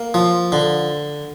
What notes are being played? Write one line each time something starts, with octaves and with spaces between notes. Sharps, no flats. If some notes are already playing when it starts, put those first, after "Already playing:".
Already playing: A#3
F3
D3